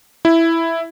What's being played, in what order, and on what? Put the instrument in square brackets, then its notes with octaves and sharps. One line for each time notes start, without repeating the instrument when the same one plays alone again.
[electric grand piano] E4